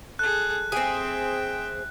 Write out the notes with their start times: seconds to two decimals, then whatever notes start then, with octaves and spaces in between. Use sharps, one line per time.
0.19 G#4 A4 F#6
0.72 C4 G#4 E5 G5